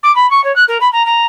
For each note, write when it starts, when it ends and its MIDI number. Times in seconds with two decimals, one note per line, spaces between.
0.03 0.13 86
0.15 0.28 83
0.30 0.43 85
0.44 0.54 73
0.55 0.64 90
0.68 0.78 70
0.80 0.90 83
0.92 1.05 82
1.05 1.25 82